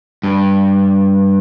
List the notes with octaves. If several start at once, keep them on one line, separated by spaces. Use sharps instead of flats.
G2